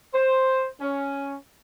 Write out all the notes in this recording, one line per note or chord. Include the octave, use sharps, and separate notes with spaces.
C5
C#4